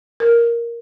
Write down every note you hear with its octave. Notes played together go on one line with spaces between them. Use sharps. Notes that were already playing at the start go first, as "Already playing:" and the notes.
A#4